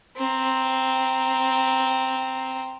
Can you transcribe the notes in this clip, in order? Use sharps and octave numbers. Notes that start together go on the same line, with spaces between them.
C4 A#5